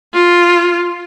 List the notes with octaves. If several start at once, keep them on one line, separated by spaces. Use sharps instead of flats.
F4